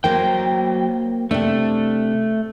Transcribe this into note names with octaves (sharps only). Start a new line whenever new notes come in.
F#3 A#3 A#4 C5 G5
C3 A3 D4